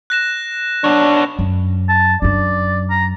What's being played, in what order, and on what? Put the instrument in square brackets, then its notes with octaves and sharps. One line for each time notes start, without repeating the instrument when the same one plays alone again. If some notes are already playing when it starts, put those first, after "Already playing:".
[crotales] F#6 A#6 E7
[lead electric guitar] B3 C#5 [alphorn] D4
[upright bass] F#2
[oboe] A5
[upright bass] F#2 D4 [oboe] D5
[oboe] A#5